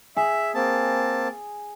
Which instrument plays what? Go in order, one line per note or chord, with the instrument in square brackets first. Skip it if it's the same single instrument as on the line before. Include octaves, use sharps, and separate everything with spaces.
[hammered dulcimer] G#4 [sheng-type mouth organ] E5
[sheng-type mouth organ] A#3 C4 A5